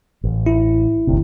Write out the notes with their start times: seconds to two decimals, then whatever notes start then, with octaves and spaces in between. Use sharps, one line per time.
0.24 A1
0.46 E4
1.07 G#1 D2 C3